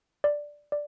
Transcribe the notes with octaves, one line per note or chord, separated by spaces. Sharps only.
D5
D5